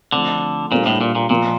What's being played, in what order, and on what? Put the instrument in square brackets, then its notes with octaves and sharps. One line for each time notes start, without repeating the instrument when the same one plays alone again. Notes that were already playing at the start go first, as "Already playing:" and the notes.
[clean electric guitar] D3 [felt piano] F3 A3 C4
[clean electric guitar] A#2 [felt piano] G3 A#3 D4 A4 C5
[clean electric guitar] A2
A#2
A#2
[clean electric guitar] A#2 [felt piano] F3 A#3 F4 A#4